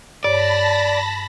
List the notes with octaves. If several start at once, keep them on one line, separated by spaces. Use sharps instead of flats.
G2 C#5 D5 A5 B5 A#6